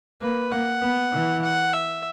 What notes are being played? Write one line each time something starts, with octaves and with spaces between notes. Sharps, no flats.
A#3 B4
A#3 F#5
B3
E3
F#5
E5